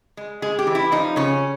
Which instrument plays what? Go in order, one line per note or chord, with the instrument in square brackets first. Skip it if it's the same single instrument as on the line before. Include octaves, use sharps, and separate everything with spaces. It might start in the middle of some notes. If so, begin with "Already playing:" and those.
[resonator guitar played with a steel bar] G#3
G#3 G#4
G4
E3
E4
F3 D#4
C#3 C#4